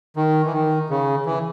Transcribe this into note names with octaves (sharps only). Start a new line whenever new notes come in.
D#3
E3
D#3
C#3
E3